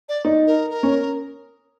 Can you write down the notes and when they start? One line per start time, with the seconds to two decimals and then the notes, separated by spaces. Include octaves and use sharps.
0.09 D5
0.25 D#4
0.47 A#4
0.70 A#4
0.83 C#4